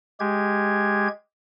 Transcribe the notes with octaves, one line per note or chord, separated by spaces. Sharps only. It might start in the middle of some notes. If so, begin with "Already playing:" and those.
G#3 G4 G#6